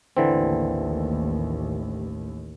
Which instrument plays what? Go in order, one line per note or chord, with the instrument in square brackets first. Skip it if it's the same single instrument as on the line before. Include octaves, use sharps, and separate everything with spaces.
[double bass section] A1 D#2 [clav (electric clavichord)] D3 E3 C4